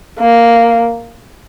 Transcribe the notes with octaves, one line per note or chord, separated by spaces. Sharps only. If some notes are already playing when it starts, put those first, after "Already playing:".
A#3